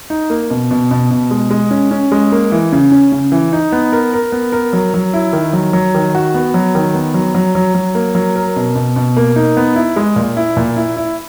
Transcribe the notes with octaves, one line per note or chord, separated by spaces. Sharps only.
D#4
A#3
B2
B2
B2
B2
G#3
G#3
C#4
C#4
G#3
A#3
E3
C#3
C#4
C#3
E3
D#4
B3
A#4
A#4
B3
A#4
F#3
F#3
E4
D#3
F#3
F#3
D#3
F#4
B3
F#3
D#3
B3
F#3
F#3
F#3
F#3
A#3
F#3
A#4
B2
B2
B2
A#3
D#4
B3
E4
G#3
A#2
E4
A#2
E4
E4